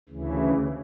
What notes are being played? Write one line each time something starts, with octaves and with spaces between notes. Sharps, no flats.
D2 C#3 E3